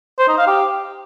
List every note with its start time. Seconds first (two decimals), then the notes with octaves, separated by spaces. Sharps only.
0.19 C5
0.28 D#4
0.38 F5
0.47 G4